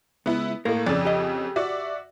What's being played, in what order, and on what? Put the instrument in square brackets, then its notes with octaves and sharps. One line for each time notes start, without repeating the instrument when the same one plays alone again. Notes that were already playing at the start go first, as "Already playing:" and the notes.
[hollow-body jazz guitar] C#2 [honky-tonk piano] B3 E4
[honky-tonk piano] A2 A3 [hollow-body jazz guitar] A#3 A#4
[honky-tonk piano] F2 C#3 [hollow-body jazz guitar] D5
[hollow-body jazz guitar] G4 D#5
[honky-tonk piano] F#4 D5 E5